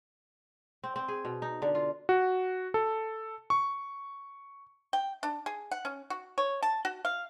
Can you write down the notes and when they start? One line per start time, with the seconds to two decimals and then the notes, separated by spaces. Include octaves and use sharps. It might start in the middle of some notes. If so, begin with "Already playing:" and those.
0.84 C4
0.96 C4
1.08 G#4
1.25 B2
1.42 D#4
1.62 D3
1.75 F4
2.09 F#4
2.74 A4
3.50 C#6
4.93 G5
5.23 D4
5.46 G#4
5.71 F#5
5.85 C#4
6.10 F#4
6.38 C#5
6.63 A5
6.85 F#4
7.05 F5